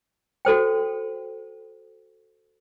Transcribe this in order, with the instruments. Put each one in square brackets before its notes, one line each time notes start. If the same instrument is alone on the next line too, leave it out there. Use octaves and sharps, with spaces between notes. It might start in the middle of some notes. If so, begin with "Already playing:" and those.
[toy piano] F#4 A4 C5 G5